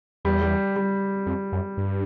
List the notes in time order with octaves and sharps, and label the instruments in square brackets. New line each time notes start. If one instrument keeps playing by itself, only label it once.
[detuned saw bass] E2 [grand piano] G3
[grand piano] G3
G3
[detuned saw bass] F2
F#2
G2